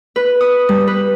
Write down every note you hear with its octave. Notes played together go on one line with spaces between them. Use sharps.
B4
D#6
G3
B4